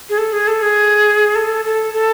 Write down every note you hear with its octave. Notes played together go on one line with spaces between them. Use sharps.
G#4
A4
G#4
A4
G#4
A4
A4
A4